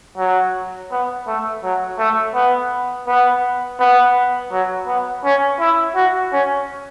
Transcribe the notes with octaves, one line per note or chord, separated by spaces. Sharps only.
F#3
B3
A3
F#3
A3
B3
B3
B3
F#3
B3
C#4
E4
F#4
C#4